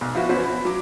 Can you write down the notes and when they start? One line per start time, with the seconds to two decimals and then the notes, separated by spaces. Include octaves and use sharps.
0.01 B1
0.15 F3 E4 F#4
0.29 E2 C#4 F#4 B4 C5
0.44 B5
0.65 F#3 D6